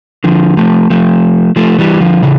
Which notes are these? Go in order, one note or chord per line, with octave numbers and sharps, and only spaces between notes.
D3 F3
F3 A3
F3 A3
F3 A3
E3 G3
D3 F3
C#3 E3